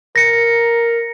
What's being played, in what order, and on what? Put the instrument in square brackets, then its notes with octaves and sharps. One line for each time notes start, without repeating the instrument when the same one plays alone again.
[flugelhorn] A#4 [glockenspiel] A#6 C#7